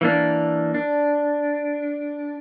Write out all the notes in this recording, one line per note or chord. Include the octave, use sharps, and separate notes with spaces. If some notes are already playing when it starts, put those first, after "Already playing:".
E3 A#3 D4
D4